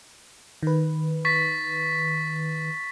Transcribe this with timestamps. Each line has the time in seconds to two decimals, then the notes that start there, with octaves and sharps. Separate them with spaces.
0.63 D#3 B4
1.25 C#6 A6 B6